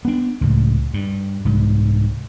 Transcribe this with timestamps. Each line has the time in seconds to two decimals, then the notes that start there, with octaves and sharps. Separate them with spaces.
0.05 B3 D4
0.41 C#2 A2
0.94 G2
1.45 C2 G#2